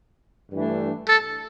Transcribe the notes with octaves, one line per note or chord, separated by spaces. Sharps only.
G2 E3 A3 D4
A4